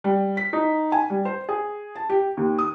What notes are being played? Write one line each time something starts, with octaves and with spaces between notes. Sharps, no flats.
G3
B6
D#4
G#5
G3
C5
G#4
A5
G4
D#2
D#6